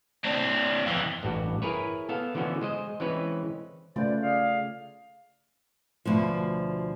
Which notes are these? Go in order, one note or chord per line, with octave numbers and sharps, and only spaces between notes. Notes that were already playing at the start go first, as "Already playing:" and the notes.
C4 D4
F2 E3
A1 G2 F#4 G4
E4 G#4 A#4 B4 C#5
B3 A4 F5
D3 E3 F3 B3 C#4 F#4
G#3 C5 D#5
E3 G#3 C4 C#4 B4 C#5
C#3 A3 F4 B4 C5 D5
G#4 D5 F5
D2 B2 F3